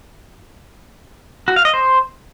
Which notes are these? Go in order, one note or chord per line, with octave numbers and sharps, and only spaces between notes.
F#4
F5
D#5
C5